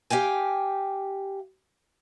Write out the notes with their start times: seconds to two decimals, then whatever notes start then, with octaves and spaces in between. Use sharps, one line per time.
0.10 G4 F5 G5 G#5